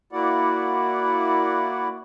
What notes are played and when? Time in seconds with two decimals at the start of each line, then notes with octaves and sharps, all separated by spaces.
0.13 A#3 E4 F#4 D5 F#5